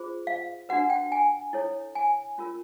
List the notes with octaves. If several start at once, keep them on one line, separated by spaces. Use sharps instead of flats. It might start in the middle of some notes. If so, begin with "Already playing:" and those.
Already playing: F4 G#4 C5
F5
D4 F#4 B4 F#5
G5
G#5
E4 A4 C#5
G#5
C#4 F4 A#4